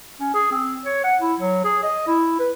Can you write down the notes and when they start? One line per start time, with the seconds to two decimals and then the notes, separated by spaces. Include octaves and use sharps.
0.20 C#4
0.34 G#4
0.51 C4
0.85 C#5
1.04 F#5
1.21 E4
1.40 F#3
1.65 G#4
1.84 D#5
2.07 E4
2.39 B4